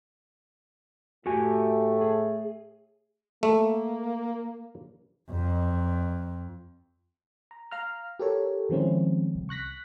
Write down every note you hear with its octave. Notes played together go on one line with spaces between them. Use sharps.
A2 A3 F#4 G4 G#5
G#4
A3 A#3
F2
A#5
F5 A#5 F6
G4 A4 A#4 C#5
D#3 F3 G#3 C4 C#4 E4
C2
C#6 F#6 A#6 B6